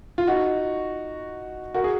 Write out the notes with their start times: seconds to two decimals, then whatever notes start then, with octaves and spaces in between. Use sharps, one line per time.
0.18 F4
0.27 D#4 F#4
1.74 F#4 A#4
1.84 G#4